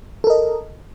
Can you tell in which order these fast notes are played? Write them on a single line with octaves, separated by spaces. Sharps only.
A4 A#4 D#5